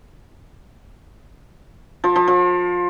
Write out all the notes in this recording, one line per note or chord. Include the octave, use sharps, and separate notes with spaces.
F3
F3
F3